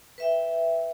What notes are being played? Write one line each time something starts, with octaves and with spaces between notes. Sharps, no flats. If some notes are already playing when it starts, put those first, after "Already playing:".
B4 E5 G5